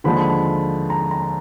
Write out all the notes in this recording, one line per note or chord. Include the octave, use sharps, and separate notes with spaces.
D#2 D3 F3 G#3 B5
A#5
A#5